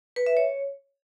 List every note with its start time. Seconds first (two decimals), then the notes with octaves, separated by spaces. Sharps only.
0.16 B4
0.26 E5
0.37 C#5